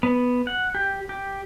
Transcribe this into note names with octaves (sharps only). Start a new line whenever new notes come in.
B3
F#5
G4
G4